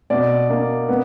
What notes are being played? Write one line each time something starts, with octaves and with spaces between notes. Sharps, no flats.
B2 D5
A#3
B3